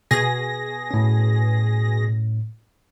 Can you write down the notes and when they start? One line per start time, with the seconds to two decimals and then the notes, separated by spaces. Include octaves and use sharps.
0.11 B2 G#4 A#6
0.91 A2 C#4